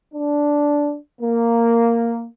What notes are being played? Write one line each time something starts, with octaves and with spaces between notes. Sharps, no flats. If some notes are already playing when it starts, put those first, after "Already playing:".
D4
A#3